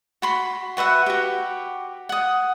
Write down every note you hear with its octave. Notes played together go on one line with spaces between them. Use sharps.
F#4 B5 C6
F#4 B4 E5 F#5
F#4 G4
F#5 D#6